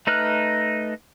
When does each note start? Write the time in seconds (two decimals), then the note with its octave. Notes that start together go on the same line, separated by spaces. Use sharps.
0.07 A3 D#4 B4 F6 F#6